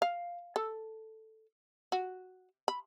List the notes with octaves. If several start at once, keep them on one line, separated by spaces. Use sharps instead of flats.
F5
A4
F#4
B5